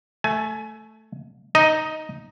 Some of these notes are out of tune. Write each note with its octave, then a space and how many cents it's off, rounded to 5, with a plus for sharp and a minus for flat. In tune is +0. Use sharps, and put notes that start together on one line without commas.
A3 +0 G#5 +25
D#4 +0 D#5 +10